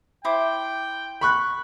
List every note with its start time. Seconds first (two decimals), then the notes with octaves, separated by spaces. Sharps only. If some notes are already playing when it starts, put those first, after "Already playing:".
0.25 E4 C5 G5 D6
1.21 B5 C#6 F#6